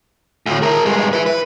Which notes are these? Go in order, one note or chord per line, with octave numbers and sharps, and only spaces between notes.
D2 A2
G#4 A#4
G2 G#3
E4 B4
B4